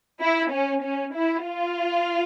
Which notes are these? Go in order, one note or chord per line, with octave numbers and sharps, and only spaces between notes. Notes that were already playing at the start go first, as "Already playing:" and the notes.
E4
C#4
C#4
E4
F4